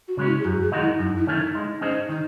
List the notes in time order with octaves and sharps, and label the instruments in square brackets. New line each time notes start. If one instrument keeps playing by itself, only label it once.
[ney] F#4
[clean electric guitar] C#3 G#3 C#4
[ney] E4
G#4
[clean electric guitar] F#2 [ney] F#4
[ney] G#4
[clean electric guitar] D#3 G#3 D#4 F#4
[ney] E4
[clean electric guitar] F#2 [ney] D#4
[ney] E4
[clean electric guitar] D#3 A3 C#4
[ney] D#4
[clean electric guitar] G#3
[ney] D#4
[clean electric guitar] C#4 G#4 C5 D#5
[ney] D#4
[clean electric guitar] D#3 [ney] D#4